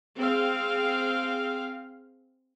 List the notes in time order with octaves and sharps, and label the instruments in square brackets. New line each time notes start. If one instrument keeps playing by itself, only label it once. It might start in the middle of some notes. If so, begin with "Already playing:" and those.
[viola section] C4 G#4 F5